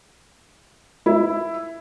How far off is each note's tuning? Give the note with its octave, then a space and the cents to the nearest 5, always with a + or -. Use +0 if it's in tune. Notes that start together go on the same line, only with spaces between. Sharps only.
E4 +5